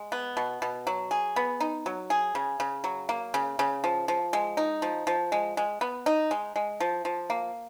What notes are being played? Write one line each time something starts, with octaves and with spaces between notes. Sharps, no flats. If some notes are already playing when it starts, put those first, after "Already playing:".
Already playing: G#3
B3
B2
B2
F#3
G#4
B3
D#4
F#3
G#4
C#3
C#3
F#3
A#3
C#3
C#3
F3
F3
G#3
D#4
F3
F3
G#3
G#3
B3
D#4
G#3
G#3
F3
F3
A#3